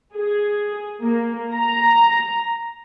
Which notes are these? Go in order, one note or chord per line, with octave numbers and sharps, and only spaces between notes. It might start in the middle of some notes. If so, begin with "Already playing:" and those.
G#4
A#3
A#5